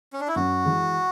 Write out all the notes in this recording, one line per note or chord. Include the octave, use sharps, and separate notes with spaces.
C#4
D4
E4
F#2 F#4
E3 G#3